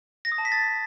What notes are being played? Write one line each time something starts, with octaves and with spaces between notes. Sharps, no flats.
A#6
D#6
A5
B6
A6